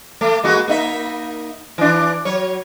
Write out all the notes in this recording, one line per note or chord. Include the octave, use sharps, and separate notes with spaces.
A3
G#3 A#3 F#4
A#3 D#4 E5
E3 D4
F#3 C#5